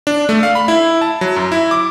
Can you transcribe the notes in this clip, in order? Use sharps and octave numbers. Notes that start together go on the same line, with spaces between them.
D4
A3
F5
B5
E4
A5
F#3
F#2
E4
D6